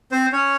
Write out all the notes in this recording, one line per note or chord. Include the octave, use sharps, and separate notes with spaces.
C4 C5
C#4 C#5